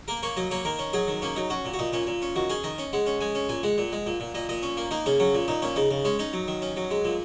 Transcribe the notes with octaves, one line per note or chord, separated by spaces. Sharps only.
A#3 A#4
A#3 C#5
F#3 D#5
A#3 C#5
D#3 A#4
C#4
F#3 G#4
D#3
A#3 C#4
F#3 D#4
C#4 F#4
A#2
F#4
A#2 D#4
A#2 C#4
A#2
C#4
D#3 F#4
C#4 G#4
D#3 D#5
C#4
G#3 F#5
C#4
G#3 G#5
C#4
A#2 G#5
G#3 F#5
A#2
G#3
A#2
A#2
A#2 D#5
A#2 D#5
C#4
A#3
A#3 D#4
C#3 C#4
F#3 C#4
A#2
A#2 D#4
A#2 C#4
C#3 D#4
C#3
G#3 C#4
C#4 D#4
F#3
D#3
C#4
F#3
G#3
A#2